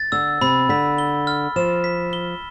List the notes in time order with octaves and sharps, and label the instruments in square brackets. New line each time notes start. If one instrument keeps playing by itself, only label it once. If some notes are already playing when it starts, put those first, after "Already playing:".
Already playing: [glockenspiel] A6
[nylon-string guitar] D3 [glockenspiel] E6
[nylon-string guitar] C3 [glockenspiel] B5
[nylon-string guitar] D3 [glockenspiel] B6
[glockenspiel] G7
F6
[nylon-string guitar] F3 [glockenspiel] E7
[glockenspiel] B6
G7